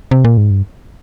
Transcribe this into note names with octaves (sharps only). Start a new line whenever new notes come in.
C3
A#2
G#2
G2